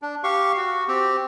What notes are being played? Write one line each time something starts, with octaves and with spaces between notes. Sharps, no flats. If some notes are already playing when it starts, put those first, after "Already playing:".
D4
G4 F5 C#6
F#4
C4 G4